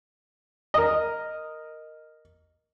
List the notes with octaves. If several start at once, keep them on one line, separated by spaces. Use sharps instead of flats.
A#4 D#5